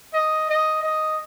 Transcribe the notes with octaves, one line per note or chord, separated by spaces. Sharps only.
D#5
D#5
D#5